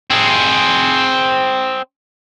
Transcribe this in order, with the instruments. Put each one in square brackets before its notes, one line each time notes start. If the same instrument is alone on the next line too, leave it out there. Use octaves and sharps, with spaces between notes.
[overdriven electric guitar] C4 G#4